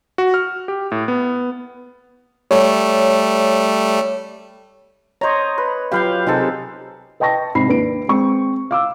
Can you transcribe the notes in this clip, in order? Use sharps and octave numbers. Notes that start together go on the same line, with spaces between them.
F#4
F6
G4
A2
B3
G3 A3 C#5
C5 C#5 D#5 A#5
B4
F#3 F4 G4 B4 F5 G5
C3 G#3 D#4 G4 A4 C5
B4 D#5 G5 A5 C#6 A#6
G#2 C3 B5 C7
D#2 D4 B4 D7
G#3 C4 C#6
F5 D6 E6